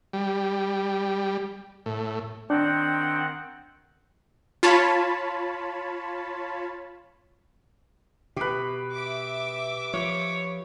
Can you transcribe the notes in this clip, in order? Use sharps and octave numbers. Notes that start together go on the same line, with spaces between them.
G3
A2
D#3 C4 D4 F#5 G5
F4 C#5 A5 B5
B2 G4 B4
E5 D6
F3 C#5